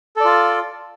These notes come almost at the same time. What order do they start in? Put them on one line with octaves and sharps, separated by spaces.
A4 D5 F4